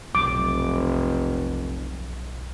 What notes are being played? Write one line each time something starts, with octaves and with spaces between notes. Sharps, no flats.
F1 B1 D6